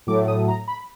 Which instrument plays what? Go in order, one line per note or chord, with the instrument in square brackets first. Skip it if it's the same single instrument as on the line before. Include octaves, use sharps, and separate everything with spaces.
[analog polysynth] A2 F#3 A3 D6
D#6
A#5
B5